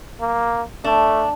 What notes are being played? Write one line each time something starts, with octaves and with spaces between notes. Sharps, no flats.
A#3
A3 D4